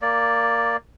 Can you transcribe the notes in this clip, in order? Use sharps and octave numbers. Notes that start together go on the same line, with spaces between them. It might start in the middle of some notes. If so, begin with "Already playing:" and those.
A#3 D5